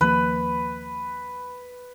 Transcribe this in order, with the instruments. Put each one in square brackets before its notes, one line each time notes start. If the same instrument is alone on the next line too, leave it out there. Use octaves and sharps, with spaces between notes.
[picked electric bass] D#2 F3 A#3 [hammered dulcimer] B4